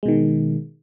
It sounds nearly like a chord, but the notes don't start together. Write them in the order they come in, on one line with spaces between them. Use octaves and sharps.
G#3 B2 D#3